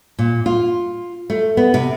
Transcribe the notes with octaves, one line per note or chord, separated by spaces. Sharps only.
A#2
F4
A3
B3
C3